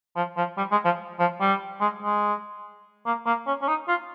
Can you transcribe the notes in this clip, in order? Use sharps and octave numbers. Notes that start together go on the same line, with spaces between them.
F3
F3
G3
G#3
F3
F3
G3
G#3
G#3
A#3
A#3
C#4
C#4
D#4
F4